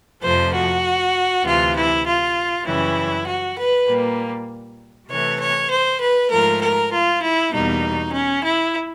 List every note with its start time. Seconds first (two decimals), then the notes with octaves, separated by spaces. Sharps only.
0.23 F2 C3 F3 A3 C5
0.53 F#4
1.44 D2 C3 E3 F4
1.75 E4
2.05 F4
2.65 F#2 C#3 E3 G3 E4
3.26 F#4
3.57 B4
3.87 A#2 G3 A#3
5.08 C3 E3 A3 C#5
5.38 C#5
5.69 C5
5.99 B4
6.30 G#2 F3 A3 A#4
6.60 A#4
6.90 F4
7.21 E4
7.51 E2 B2 G3 A#3 D#4
8.11 C#4
8.42 E4